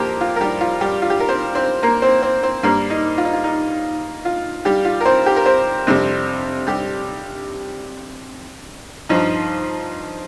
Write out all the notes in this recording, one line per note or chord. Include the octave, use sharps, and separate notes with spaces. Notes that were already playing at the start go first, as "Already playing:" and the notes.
Already playing: F2 F3 A#3 C4 G4 A#4 C5
F4
A#4
G3 G4
F4
G3 G4
F4
G4
A#4
C4 C5
C4 C5
A#3 A#4
C4 C5
C4 C5
C4 C5
G2 G3 A#3 A#4
D#4
F4
D#4
F4
D#4
F4
G3 G4
F4
A#4
C4 C5
G4
A#4
C4 C5
F2 C3 G3
G3 G4
G2 F3 D#4